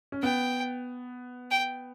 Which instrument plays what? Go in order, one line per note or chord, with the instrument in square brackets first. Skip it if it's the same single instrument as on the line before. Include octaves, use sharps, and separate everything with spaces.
[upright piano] C#4
[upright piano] B3 [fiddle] G5
[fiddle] G5